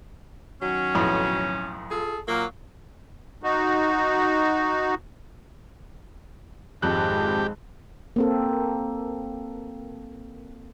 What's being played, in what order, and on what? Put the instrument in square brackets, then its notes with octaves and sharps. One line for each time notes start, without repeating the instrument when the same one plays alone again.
[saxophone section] D#3 F#3 [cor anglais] C#4
[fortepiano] B1 F2 A2
[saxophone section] F4 G#4 A4
[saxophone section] A#2 A#3 [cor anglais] F#3
[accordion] D#4 F#4
[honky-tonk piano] G#1 F2 F#6 [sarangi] G#3 [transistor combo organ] G4
[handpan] A#3 C4 A4